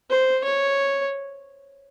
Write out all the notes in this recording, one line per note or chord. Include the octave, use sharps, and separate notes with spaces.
C5
C#5